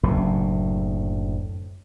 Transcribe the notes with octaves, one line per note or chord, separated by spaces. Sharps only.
F#1 D2 A2